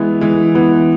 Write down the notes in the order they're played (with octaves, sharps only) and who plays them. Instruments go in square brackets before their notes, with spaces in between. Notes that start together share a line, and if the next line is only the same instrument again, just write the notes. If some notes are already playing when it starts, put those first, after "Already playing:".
Already playing: [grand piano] E3 B3 [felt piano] G#3 E4
[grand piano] E3 [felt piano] G#3
[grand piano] E3 [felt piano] B3